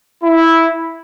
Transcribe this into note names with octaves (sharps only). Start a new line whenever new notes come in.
E4